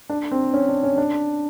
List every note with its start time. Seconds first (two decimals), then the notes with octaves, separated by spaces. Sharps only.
0.10 D4
0.31 C4
0.54 C#4
0.69 D4
0.83 C#4
0.98 D4